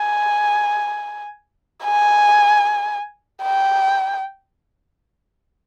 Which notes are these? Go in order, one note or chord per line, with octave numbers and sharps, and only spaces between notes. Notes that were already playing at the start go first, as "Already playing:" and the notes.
Already playing: G#5
G#5
G5